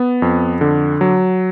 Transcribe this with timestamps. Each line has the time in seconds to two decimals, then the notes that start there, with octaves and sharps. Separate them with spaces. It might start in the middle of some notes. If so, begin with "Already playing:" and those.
Already playing: B3
0.22 F2
0.61 D3
1.01 F#3